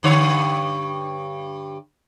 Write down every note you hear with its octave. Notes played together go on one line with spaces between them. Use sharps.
G2 D3 C#5